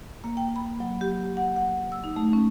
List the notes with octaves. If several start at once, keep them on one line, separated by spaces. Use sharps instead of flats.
A#3
G5
B5
F#3
G4
F#5
F#5
E6
D#4
A3
C#4